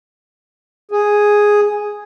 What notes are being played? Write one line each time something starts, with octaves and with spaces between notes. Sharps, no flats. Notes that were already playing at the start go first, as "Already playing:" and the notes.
G#4